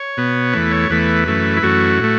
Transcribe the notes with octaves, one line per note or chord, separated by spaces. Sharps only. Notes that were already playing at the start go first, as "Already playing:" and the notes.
Already playing: C#5
B2 B3
E2 E3 A3 B4
C#5
E2 E3 A3 B4
F#2 E3 A3
E4
F#2 E3 A3 F#4
A2 A3